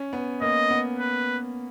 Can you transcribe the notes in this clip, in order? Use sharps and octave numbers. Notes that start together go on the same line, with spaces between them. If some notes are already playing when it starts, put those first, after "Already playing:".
Already playing: C#4
B3
A#3 D#5
B3
B4